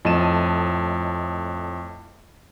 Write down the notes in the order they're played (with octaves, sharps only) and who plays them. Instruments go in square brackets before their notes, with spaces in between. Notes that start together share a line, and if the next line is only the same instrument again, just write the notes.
[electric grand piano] F2 A2 D#5 A5 D#7 E7